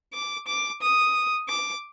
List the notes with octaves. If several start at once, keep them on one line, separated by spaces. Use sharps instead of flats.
D6
D6
D#6
D6